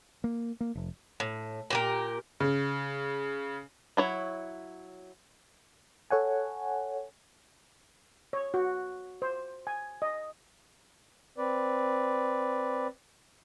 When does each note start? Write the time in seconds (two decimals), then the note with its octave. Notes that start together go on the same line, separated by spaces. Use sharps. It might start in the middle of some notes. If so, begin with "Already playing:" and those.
0.24 A#3
0.60 A#3
0.75 F1
1.20 A2
1.70 A#2 G4 A#4
2.40 C#3
3.97 F#3 E4 C#5
6.10 A4 C#5 F#5 G#5
8.33 C#5
8.54 F#4
9.22 C5
9.67 G#5
10.02 D#5
11.38 C4 B4 D5